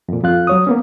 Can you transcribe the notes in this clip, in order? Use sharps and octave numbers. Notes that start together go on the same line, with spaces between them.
F2 A#2
F2 F4 F5 F#6
F#3 C#5 D#6
A#3 B3 C#4